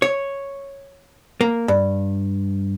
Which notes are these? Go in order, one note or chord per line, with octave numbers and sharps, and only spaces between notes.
C#5
A#3
G2